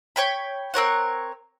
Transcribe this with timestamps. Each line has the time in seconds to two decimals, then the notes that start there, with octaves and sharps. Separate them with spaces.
0.16 C#5 G5 B5
0.74 C4 A#4 C#5 F#5